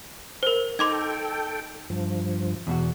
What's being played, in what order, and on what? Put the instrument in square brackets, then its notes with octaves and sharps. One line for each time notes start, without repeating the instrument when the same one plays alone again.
[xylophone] A#4 C5
[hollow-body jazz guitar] D#4 [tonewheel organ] A4 G5 [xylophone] C6 D6 G#6
[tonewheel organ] G2 F3
[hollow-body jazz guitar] E2 B2 F#4